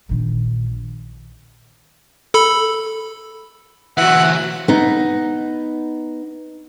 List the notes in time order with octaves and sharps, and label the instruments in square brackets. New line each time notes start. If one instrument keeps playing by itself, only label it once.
[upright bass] A#1 D#3
[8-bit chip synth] A4 B5
[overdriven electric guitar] E3 F#3 [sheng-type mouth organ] E5 F#5 F#6
[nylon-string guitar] B3 D#4